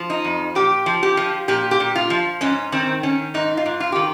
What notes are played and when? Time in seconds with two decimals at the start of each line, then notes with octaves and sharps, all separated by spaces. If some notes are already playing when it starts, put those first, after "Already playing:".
Already playing: F3
0.10 D#4
0.24 F2
0.55 A#2 G4
0.86 F3
1.03 G4
1.17 F3
1.48 A#2 G4
1.71 G4
1.80 A#2
1.95 F4
2.10 F3
2.41 G#2 C#4
2.72 D#3 C4
3.03 D#3 C#4
3.34 G#2 D#4
3.57 F4
3.66 G#2
3.80 F4
3.92 D#3 G4